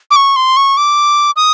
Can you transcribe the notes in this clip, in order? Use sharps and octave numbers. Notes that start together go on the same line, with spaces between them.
D6
C#6
C6
C#6
D6
D#6